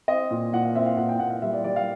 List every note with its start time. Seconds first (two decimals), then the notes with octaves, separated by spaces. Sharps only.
0.08 C4 D#5
0.31 A#2
0.53 A#2 F#5
0.64 F5
0.75 C4 E5
0.86 F5
0.97 A#2 F#5
1.09 G5
1.19 A#2 F#5
1.30 F5
1.42 G3 E5
1.53 D5
1.64 G3 D5
1.76 F5